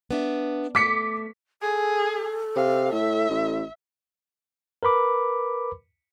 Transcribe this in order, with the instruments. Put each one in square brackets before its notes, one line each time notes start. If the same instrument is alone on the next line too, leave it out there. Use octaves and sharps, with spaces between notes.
[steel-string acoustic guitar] B3 D4 E5
[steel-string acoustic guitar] A3 [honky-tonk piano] D6 B6 C#7
[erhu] G#4 [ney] A4
[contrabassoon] C3 [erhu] F5
[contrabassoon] A2 [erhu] E5
[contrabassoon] A1
[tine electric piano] A#4 B4 B5 D6